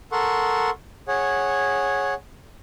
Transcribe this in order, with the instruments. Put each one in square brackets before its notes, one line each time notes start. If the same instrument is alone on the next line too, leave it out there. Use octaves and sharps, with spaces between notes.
[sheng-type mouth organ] A4 A#4 F#5 C6 C#6
G#4 C#5 F#5